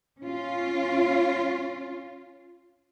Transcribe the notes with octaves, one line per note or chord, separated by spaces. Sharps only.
C#4 F4